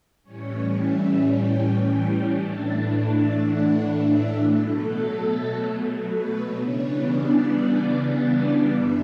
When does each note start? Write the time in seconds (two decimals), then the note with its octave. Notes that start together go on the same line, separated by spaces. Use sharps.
0.23 A2 E3 G3 C#4 C#5
0.77 E5
1.29 G5
1.82 G5
2.34 A2 E3 A3 D4 A5
2.87 A5
3.41 F#5
3.93 E5
4.46 B2 F#3 A3 A4
6.04 B4
6.57 C#3 E3 G3 B3 D4 C#5
7.10 D5
8.15 D5
8.68 F#2 D3 G3 E5